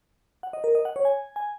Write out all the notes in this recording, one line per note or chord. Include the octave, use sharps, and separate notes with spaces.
F#5
D#5
A#4
D#5
F#5
C#5
G#5
G#5